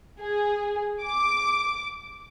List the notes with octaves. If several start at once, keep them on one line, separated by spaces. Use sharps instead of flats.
G#4
D6